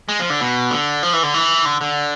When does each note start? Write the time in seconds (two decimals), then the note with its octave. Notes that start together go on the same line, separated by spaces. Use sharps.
0.09 G#3
0.19 F3
0.30 D3
0.40 B2
0.71 D3
1.03 F3
1.13 E3
1.23 D3
1.34 E3
1.65 D3
1.81 D3